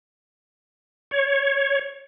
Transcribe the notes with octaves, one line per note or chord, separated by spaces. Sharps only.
C#5